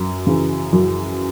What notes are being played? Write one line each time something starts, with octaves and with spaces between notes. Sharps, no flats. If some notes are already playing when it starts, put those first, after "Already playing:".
Already playing: F#2
C#3 E3
F#2